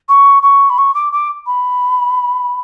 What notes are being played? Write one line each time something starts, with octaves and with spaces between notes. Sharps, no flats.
C#6
C#6
B5
C#6
D6
D6
B5